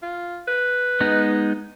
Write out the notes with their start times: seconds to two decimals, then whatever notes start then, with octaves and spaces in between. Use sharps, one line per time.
0.02 F4
0.48 B4
1.01 G#3 B3 D#4